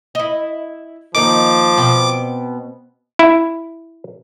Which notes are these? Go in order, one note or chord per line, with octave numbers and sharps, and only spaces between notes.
E4 D#5
D#3 F3 A#3 D#4 D6
B2 C4
E4